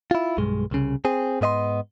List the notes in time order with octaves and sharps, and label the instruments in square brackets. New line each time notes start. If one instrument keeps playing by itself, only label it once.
[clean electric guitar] E4 F4
B1 G2 G#3
C2 C#3
C4 G#4
G#2 B3 D#5 E5 C6